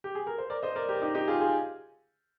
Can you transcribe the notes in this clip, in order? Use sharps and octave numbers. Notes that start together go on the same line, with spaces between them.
G4
G#4
A#4
C5
A#4 D5
C5 D#5
A#4 D5
G4 A#4
D#4 G4
D#4 G4
F4 G#4
F4 G#4